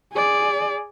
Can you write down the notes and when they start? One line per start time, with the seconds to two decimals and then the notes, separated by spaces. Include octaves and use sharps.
0.13 G#4 D5